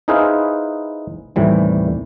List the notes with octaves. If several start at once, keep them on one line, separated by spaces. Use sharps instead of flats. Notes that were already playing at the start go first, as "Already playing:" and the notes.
D#4 E4 G#4 B4 C5 F5
D#2 A2 C3 E3 G3